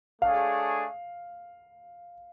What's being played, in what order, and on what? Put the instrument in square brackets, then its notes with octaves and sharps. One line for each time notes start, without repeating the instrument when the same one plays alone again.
[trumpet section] A3 D4 G#4 C#5 [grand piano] F5